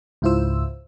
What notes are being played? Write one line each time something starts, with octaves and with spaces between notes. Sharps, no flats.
C#2 G#2 E4 F4 C5 E6